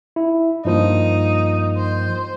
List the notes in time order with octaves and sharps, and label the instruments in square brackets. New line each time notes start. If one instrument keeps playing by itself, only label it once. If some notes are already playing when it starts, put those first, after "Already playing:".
[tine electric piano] E4
[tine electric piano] G2 F3 A#3 [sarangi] D#4
[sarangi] C5